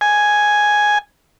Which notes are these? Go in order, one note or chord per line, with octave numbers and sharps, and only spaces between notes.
G#5